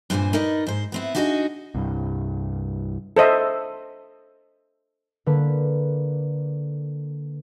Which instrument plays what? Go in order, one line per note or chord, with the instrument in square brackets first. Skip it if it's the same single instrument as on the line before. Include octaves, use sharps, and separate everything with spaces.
[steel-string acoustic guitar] G2 A#2 C4 G4 C5 G#5
D#4 A#4 B4 D5 D#5
G#2 C5
B3 C4 E4
D4 D#4 F#4 G#4 D5 D#5
[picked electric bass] C2 G2
[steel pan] A4 C5 D#5 E5
[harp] D3 A#3 B4